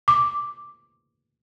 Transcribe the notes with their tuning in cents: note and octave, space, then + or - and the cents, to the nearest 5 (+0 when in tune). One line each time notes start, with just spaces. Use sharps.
D6 +0